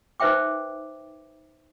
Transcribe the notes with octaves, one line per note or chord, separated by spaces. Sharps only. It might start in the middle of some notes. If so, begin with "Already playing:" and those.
D#4 B4 C5 E5 G5 D6